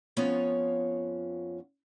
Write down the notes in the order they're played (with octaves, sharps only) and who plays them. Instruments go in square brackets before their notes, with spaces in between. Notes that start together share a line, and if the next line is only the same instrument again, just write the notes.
[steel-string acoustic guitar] F2 B3 C#4 F4 C#5 F5